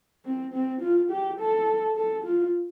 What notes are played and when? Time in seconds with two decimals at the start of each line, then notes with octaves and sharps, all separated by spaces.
0.25 C4
0.54 C4
0.81 F4
1.10 G4
1.39 A4
1.96 A4
2.25 F4